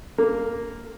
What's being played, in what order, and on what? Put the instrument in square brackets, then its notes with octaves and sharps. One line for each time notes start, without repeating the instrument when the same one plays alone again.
[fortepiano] A#3